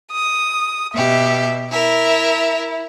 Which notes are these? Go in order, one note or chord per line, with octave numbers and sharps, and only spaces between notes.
D#6
B2 G4 E5
E4 A#4 E5